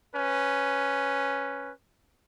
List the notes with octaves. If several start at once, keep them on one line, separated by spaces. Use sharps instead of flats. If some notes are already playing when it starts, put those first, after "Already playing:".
C#4 B4